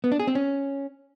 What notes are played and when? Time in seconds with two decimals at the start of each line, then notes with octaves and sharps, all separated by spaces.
0.04 B3
0.12 D4
0.20 G#4
0.27 C4
0.35 C#4